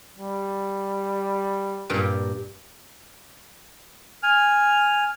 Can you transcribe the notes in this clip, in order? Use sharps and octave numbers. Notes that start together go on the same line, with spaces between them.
G3
G2 A#2 G4
G#5 F6